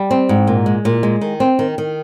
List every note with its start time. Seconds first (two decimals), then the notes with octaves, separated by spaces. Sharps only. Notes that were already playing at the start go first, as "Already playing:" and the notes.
Already playing: G3
0.11 C4
0.29 G#2
0.47 A#2
0.66 G#3
0.85 A#2
1.03 G#3
1.21 D#3
1.40 C4
1.59 D#3
1.78 D#3